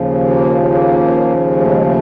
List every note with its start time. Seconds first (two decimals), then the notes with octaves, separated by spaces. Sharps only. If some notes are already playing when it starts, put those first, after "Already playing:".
Already playing: D#2 C#3 F3
0.27 A#3
0.71 A#3
1.59 A3
1.70 G#3
1.81 A3